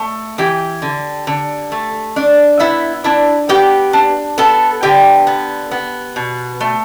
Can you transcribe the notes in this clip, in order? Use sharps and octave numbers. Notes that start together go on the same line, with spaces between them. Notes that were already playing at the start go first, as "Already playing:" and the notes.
Already playing: A3
E3 G4 G5
D3
D3
A3
D4
B3 E4 E5
D4 E4
B3 G4 G5
D4
B3 A4 A5
D3 G4 G5
B3
B3
B2
A3